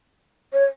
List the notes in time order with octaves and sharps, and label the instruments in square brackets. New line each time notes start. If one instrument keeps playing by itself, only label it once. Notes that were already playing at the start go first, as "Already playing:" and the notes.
[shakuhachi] C#5